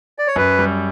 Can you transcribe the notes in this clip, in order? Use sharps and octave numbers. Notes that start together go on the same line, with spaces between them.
D5
C#5
F#2 B4
G3